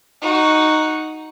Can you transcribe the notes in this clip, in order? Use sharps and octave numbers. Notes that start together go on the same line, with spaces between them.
D#4 F#4